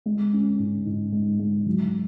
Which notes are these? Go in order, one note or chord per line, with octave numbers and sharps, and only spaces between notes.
G#3
C#4
G#2
G#2
G#3
G#3
F#3